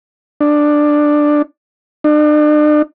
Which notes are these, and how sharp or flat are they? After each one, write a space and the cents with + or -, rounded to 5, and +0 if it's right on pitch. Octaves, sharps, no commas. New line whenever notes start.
D4 +10
D4 +40